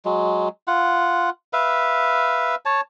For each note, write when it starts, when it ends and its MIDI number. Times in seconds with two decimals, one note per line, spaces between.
0.05 0.48 54
0.05 0.48 56
0.67 1.30 65
0.67 1.30 78
1.53 2.55 71
1.53 2.55 76
1.53 2.55 77
2.65 2.81 73
2.65 2.81 81